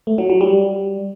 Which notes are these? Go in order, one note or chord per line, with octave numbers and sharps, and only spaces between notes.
A3
F#3
F#3
G3